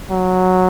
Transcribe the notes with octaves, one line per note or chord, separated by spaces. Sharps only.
F#3